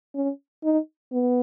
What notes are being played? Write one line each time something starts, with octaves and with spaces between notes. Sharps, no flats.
C#4
D#4
B3